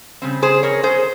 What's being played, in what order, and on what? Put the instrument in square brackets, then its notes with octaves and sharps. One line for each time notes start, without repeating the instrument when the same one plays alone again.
[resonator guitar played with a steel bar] C#3 G3 C4
G#4 C5
A#4 C#5
G#4 C5